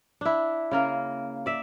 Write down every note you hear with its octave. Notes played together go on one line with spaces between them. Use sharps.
D4 E4
C#3 A#3 A#4
D5 E5